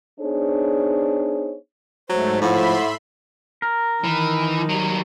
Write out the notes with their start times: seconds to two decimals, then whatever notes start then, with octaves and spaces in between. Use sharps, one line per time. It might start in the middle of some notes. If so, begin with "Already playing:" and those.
0.20 B3 D4 D#4 G#4 C5 C#5
2.09 G#2 F#3 A3 C5
2.41 A2 F3 E5 F#5 B5 C6
3.62 A#4
4.04 D#3 E3
4.70 F#3 G3